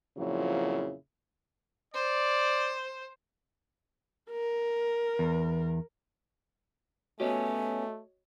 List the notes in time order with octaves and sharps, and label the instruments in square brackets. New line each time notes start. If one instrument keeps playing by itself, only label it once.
[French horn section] F2 A#2 C#3 F3 F#3 E4
[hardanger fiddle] C5 [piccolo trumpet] D5
[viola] A#4
[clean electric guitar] E2
[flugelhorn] A3 [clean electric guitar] B3 C#4 G4 [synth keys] F#4 C#5 D#5 [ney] G#5